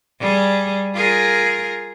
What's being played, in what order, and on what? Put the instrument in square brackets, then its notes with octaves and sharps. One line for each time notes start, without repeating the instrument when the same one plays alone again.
[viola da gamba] G3 G#4
F4 G#4 A#4